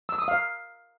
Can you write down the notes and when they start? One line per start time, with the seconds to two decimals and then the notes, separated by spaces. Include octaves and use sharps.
0.09 E6
0.18 D#6
0.28 F5